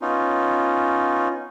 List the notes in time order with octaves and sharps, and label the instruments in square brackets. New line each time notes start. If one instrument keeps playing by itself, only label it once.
[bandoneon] B3 C#4 D#4 F4